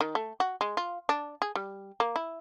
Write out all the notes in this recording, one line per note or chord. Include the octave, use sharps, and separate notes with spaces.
D#3
A3
F#4
G#3
F4
D4
G#4
G3
A#3
E4